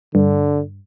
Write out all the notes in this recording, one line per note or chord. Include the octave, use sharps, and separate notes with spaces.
G2 D3